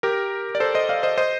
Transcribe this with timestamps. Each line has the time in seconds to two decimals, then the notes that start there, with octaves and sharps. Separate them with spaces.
0.03 G4 A#4
0.55 D5
0.60 A4 C5
0.75 C5 D#5
0.89 D5 F5
1.03 C5 D#5
1.18 C5 D#5